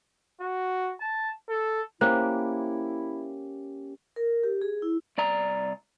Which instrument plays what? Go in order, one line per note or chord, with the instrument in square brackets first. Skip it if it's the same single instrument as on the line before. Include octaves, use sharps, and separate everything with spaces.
[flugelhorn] F#4
A5
A4
[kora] A#3 [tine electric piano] C#4 G4 [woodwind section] E4 [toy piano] C5
[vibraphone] A#4
G4
G#4
E4
[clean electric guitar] C2 D5 A#5